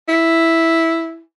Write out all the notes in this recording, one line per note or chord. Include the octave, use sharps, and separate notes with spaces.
E4